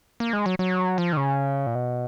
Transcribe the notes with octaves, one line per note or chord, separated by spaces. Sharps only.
A#3
G#3
F#3
F#3
F3
D#3
C#3
A#2
B2